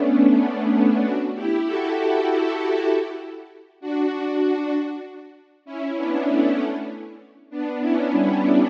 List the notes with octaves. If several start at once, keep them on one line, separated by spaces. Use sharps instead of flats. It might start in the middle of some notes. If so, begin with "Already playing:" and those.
Already playing: A3 B3 C#4 D4
A3 C#4
B3 D4
B3 D4
D4 F#4
E4 G4
F#4 A4
D4 F#4
C#4 E4
B3 D4
A3 C#4
B3 D4
C#4 E4
G3 B3